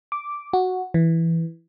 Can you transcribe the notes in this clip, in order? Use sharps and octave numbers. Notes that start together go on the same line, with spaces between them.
D6
F#4
E3